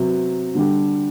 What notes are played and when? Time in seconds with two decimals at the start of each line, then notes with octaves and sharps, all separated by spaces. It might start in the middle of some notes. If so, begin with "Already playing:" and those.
Already playing: C3 F#3 B3 F#4
0.55 D3 G3 D4 G4